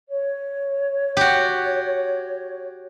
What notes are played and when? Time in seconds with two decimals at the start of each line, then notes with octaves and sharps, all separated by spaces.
0.09 C#5
1.17 F#4 G4